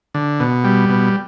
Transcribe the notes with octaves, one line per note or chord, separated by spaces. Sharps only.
D3
B2
G3
B2